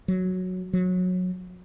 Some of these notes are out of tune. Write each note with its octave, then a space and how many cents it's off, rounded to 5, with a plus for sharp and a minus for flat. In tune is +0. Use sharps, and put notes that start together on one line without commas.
F#3 -5
F#3 -20